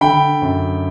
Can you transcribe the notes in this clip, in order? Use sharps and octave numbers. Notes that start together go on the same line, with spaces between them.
D3 G5 B5
F#2